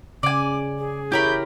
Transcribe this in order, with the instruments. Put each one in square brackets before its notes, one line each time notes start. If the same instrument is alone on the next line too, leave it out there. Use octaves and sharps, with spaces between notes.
[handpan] C#3 [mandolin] D5 G#5 [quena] D6
[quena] G#4
[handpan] E4 C#5 [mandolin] G4 A#4 B5 [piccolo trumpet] G6